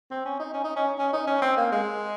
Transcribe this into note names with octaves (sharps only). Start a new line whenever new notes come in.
C4
C#4
D#4
C#4
D#4
C#4
C#4
D#4
C#4
C4
A#3
G#3